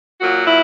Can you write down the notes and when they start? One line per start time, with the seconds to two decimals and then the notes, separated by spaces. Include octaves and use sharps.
0.21 A#2 F#3 A#3 F#4
0.46 E4